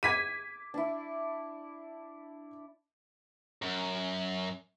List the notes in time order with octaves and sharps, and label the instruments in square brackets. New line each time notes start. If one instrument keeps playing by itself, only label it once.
[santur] D6 [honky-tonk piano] G#6 B6 D#7
[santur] D4 E4
[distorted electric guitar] F#2